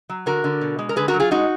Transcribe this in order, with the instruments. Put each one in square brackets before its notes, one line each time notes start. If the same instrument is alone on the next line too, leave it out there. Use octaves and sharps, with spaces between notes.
[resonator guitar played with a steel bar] F#3
D3 F#4 A#4
D3
B2
G#3
A#4
D3 G#4 B4
F#4 A#4
F#3
F4 G#4
G#3 D#4 F#4